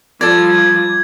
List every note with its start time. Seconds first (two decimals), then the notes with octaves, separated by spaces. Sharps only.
0.21 F3 G3 A4 D5 G#6